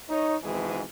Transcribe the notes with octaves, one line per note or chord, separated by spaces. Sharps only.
D#4 C#5
G#1 F2 G#2 B2 E3 G#4